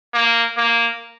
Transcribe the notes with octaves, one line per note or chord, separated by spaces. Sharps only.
A#3
A#3